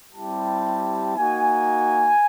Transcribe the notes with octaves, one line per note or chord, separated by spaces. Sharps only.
G3 C4 E4 G4 A5
A#3 D#4 F#4 G#5